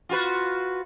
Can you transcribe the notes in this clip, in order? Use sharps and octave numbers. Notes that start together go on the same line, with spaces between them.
F4 F#4 B4